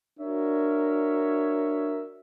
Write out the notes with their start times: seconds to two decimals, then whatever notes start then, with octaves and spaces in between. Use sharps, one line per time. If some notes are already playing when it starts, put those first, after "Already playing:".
0.20 D4 F#4 A#4 C#5 E5